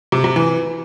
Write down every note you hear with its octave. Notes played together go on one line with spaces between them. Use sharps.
C3
C3
E3